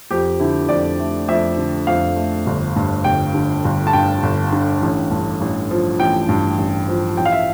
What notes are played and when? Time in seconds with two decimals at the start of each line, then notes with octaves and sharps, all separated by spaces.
0.11 F2 G4
0.40 D3 E4
0.69 F2 D5
0.99 A3
1.28 F2 E5
1.57 D3
1.87 F2 F5
2.16 A3
2.47 G1
2.76 G2
3.04 G1 G5
3.34 D3
3.65 G1
3.87 A5
3.93 G2 G5
4.23 G1
4.52 D3
4.82 A1
5.11 G2
5.41 A1
5.71 F3
5.99 A1 G5
6.29 G2
6.58 A1
6.88 F3
7.17 A1 G5
7.26 F5
7.32 E5